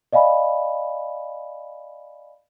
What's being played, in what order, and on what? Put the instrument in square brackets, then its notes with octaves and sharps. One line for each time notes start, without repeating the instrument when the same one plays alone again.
[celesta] D5 D#5 F5 G#5 B5